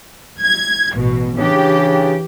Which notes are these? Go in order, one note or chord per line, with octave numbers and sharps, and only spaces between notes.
G#6
A1 B2
C#3 E3 D4 G4